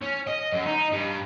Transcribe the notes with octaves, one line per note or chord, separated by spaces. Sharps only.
C#4
D#5
F#2
D#4
G2